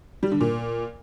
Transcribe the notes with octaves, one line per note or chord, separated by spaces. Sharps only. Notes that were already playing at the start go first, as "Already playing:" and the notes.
G3
D3
A#2